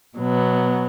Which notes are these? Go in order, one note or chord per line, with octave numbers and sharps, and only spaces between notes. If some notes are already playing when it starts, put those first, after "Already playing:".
B2 F#3 B3